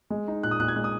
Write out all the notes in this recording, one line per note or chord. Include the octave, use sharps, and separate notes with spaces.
G#3
D#4
A#2 F#6
D#6
A#2 F#6
G#6
G#3 F#6
D#6